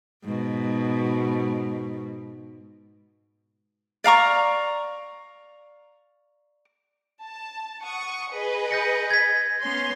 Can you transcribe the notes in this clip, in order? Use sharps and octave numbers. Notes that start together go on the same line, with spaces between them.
G#2 B2
D5 F5 A#5 C#6
A5
F#5 C#6 D#6
G#4 B4 D#5
G6 A#6 C#7
G#6 B6
B3 C#4 C6